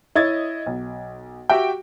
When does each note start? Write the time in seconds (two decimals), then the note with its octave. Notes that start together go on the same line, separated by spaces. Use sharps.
0.16 E4 C#5 D#5 G#6 A6
0.66 B1
1.50 F#4 G4 E5 G5